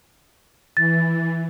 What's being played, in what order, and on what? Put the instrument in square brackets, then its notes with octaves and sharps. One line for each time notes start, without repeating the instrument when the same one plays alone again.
[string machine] E3 [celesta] A6